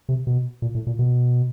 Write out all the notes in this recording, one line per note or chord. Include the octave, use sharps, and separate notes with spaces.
C3
B2
A#2
A2
A#2
B2